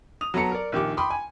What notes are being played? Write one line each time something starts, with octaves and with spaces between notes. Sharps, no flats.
D#6 F7
F#3 B3 A4 A5 A#5 C#7
A#4 D5
A#1 D#3 G4 D6
G5 B5 C6 D6 D#6
G#5